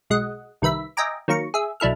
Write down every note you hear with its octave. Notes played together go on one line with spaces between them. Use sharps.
B1 G#3 D#5 F#5
C2 D#3 B4 E5 B6
D#5 E5 G5 G#5 A#5 D6
D#3 F#3 A#3 A#5 C#6
G#4 E5
B1 D4 E4 A4 F6